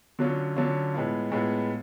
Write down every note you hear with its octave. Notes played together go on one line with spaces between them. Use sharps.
D3 F#3 C#4 F4
D3 F#3 C#4 F4
A2 G#3 B3 F4
A2 G#3 B3 F4